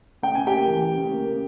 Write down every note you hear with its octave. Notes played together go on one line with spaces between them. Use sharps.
C#3 G5
C#3 G#5
G4 G5
A#3
E3
C#3
C#3
A#3
C#3